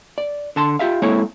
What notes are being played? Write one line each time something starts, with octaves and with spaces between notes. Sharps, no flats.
D5
D3 A5 C6
F4 G4 E5 F5
G#3 A#3 C4 E4 A4 C#5